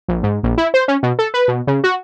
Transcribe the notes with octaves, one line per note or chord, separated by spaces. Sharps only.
A#1
G#2
A#1
E4
C5
C#4
B2
A4
B4
B2
C#3
F#4